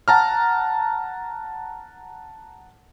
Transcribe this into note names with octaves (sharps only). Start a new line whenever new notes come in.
F#5 A5 A#5 F6